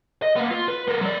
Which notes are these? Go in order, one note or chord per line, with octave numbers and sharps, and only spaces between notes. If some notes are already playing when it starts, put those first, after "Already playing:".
D#5
A#3 B3
F4
B4
B3 A#4
F#3 D5